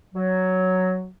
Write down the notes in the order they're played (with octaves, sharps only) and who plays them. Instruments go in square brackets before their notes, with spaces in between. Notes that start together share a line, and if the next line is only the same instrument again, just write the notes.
[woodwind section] F#3